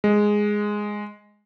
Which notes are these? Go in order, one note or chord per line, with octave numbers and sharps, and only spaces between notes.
G#3